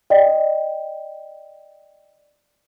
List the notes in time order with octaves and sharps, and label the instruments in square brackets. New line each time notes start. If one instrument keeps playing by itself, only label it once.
[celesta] D5 D#5 G5